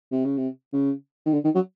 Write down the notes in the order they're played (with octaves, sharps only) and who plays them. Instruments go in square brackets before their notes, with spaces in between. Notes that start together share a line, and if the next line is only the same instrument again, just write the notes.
[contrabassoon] C3
C#3
C3
C#3
D#3
D3
D#3
F#3